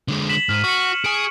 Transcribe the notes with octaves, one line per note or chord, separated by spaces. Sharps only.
D3 G#3
B6 E7 F#7
G#2 F6 D#7
F#4 C#6 C#7
G#4 G#5 D7